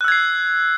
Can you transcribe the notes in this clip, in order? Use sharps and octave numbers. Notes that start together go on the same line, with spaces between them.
E6 F#6 G#6 C7